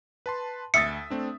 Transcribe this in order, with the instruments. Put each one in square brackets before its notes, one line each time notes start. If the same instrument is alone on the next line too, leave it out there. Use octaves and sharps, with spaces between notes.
[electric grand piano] B4 A5 C6
[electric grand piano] D2 [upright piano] E5 D#6 A6 [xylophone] C#7
[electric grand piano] A3 C4 D4